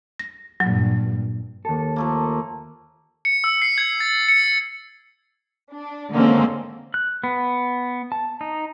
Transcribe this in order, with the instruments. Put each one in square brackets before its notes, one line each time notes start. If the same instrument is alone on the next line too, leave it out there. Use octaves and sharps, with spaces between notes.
[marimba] A#6
[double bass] G2 A#2 [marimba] F#3
[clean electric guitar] D#2 A4
[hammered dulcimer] F3 A3 A#3
[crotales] C#7
E6
C7
G#6
A6
C#7
[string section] D4
D3 D#3 G#3 A#3 C4 C#4
[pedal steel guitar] F#6
B3
A5
D#4